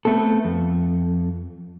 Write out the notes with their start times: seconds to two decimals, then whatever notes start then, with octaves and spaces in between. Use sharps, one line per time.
0.05 A3 B3 C4 A4
0.45 F2